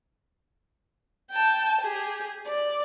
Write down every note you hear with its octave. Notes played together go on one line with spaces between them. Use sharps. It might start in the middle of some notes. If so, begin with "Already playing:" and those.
G5 A5
G4 G#4
D5